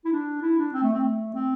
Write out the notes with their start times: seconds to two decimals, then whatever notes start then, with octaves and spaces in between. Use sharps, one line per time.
0.05 E4
0.12 D4
0.42 E4
0.58 D4
0.73 C4
0.83 A3
0.93 C4
1.04 A3
1.34 C4